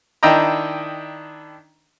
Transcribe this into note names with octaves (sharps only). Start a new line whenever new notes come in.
D#3 D4 E4 D#5 G5 A#5